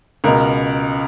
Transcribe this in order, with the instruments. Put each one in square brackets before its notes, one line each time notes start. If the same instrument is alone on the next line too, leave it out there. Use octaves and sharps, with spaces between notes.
[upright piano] C#2 B2 A#4